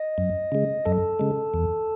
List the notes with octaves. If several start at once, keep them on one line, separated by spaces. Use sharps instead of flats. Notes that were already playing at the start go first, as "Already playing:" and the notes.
Already playing: D#5
F#2
C#3 G#3
F#2 A4
C#3 G#3
E2